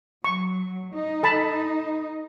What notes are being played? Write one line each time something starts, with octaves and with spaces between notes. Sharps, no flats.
F#3 C#6
D#4
A4 A5 B5